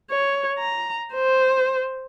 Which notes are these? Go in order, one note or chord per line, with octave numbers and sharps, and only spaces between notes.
C#5
A#5
C5